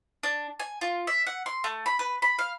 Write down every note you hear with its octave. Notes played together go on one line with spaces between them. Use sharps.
D4
G#5
F4
E5
F#5
C6
A3
B5
B4
B5
F5